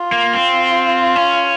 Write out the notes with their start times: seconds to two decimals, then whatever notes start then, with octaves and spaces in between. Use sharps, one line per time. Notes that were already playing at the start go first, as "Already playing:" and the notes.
Already playing: F4
0.12 A#3
0.33 C4
1.16 C#4